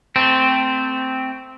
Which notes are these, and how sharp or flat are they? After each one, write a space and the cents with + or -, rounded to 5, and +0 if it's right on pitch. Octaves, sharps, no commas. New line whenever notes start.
A3 +15 C4 -5